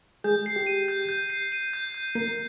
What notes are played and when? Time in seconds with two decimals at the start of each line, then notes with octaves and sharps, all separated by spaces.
0.24 G#3 G#4 G6
0.46 C7
0.56 G4
0.66 D#7
0.88 G6
1.09 G6
1.30 C7
1.52 D#7
1.73 G6
1.94 G6
2.15 A#3 A#4 C7